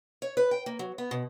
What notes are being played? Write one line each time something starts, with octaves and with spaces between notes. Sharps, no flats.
C#5
B4
G5
A#3
F#3
B3
B2